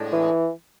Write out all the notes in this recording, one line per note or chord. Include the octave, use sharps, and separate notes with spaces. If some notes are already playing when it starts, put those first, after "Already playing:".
Already playing: A2 G#3 D4
E3